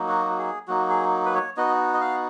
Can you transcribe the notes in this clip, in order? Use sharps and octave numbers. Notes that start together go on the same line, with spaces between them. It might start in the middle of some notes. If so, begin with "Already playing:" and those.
Already playing: F#3 A#3 D#4
F#4
G#4
F#3 A#3 D#4 F#4
G#4
B4
C#5
B3 D#4 F#4 D#5
D#5
F5